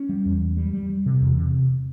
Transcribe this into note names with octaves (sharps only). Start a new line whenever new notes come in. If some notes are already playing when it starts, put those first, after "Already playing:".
Already playing: C#4
G3
E2
G3
G3
G3
G3
C3
E2
C3